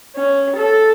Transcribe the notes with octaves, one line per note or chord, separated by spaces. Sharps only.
C#4
A4